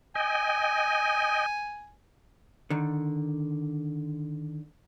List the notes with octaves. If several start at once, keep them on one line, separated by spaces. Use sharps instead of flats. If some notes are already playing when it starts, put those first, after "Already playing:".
D#5 G5 G#5
D3 D#3